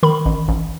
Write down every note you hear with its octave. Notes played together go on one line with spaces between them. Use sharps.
D#3 B5
A1
A1